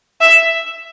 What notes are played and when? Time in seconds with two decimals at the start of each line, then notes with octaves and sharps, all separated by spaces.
0.21 E5